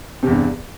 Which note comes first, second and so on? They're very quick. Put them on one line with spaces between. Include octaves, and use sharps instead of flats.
C3 E2 G2